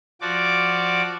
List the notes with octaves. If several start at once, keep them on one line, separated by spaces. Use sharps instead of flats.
F3 F#4 D5 D6